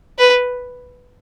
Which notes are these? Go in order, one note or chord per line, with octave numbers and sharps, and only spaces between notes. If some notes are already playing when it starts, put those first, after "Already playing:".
B4